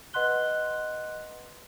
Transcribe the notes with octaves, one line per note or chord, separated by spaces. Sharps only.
B4 D#5 F#5 C6 F#6 G7